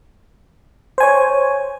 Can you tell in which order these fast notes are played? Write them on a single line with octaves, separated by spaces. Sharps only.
C5 G#5 C#5